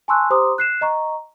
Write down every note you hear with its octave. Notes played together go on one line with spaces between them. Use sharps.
G#5 A5 C6 C#6 E6 F#6
G4 C5 A#5 C6 D6 D#6
F#6 C7 E7
D#5 A#5 C#6